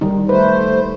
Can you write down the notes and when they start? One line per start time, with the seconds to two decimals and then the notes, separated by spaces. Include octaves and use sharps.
0.01 D#3 G3 D#4
0.29 A3 B4 C5